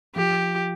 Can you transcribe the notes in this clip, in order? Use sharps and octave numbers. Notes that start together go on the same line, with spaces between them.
F3 G4